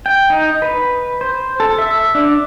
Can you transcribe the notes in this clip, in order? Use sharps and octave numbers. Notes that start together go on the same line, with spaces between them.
G5
D#4
B4
C5
A4
E5
D4